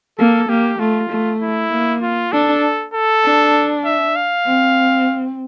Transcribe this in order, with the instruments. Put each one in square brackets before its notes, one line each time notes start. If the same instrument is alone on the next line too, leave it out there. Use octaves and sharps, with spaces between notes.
[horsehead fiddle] A#3 [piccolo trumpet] A4
[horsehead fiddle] A#3 [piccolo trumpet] G4
[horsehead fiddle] A3 [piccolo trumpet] F4
[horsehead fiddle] A3
[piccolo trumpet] E4
[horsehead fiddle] A#3
[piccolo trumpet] F4
[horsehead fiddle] D4 [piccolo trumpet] A4
[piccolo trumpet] A4
[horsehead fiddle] D4
[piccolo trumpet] E5
F5
[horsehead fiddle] C4